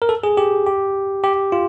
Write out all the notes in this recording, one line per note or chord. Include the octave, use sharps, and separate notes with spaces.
A#4
A4
G#4
G4
G4
G4
F4